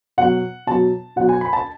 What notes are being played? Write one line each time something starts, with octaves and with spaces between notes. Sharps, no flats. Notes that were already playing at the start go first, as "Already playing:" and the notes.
B2 F#3 F#5
B2 F#3 A5
B2 F#3 F#5
G#5
B5
A5